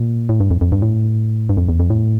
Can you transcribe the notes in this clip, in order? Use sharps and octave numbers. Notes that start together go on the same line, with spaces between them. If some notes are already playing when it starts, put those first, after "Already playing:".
Already playing: A#2
A2
G2
F2
F2
G2
A2
G2
F2
E2
F2
A2